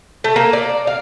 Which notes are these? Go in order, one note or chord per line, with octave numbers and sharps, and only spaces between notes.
A3
A#3
D5
F5